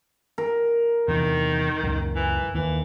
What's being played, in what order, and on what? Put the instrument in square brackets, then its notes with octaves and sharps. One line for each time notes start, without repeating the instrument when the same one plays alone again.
[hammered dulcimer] A#4
[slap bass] E2 C3 E3 [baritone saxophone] D#3
[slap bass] C#2 F#2 A#2
[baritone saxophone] E3
[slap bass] D#2 [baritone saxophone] E3